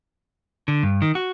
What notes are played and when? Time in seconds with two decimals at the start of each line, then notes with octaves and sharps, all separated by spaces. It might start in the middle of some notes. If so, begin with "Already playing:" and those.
0.68 D3
0.83 G2
1.02 D#3
1.15 F#4